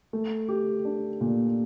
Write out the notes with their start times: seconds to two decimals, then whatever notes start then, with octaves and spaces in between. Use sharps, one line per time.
0.13 A3
0.49 G4
0.85 D4
1.21 A#2